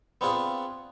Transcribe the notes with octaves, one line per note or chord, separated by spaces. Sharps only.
B3 C4 D4 F4 G#4 F#5